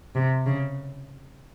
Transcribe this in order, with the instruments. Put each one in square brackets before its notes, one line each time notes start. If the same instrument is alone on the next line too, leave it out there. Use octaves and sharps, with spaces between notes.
[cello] C3
C#3